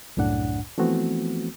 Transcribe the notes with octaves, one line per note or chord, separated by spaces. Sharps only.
C2 F#2 A2 D4 F#5
E3 F3 A3 B3 C4 F#4